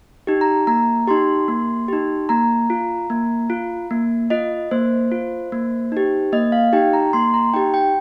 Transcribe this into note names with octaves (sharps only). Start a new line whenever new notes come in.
D#4 G4
A#5
A#3 A#5
D#4 G4 C6
A#3
D#4 G4
A#3 A#5
F4
A#3
F4
A#3
F4 D#5
A#3 C5
F4
A#3
D#4 G4
A#3 D#5
F5
D#4 G4 G5
A#5
A#3 C6
A#5
D#4 G4 G5
G5